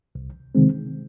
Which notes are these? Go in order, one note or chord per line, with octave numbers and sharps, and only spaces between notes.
C2
C3 D#3 G#3 C4